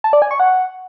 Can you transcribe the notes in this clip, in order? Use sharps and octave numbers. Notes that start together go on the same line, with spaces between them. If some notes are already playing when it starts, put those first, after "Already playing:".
A5
D5
G#5
C#6
F#5